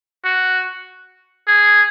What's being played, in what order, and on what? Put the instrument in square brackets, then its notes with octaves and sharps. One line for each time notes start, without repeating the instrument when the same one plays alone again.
[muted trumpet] F#4
G#4